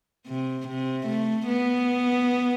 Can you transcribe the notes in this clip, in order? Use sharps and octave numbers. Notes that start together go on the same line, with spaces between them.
C3
C3
A3
B3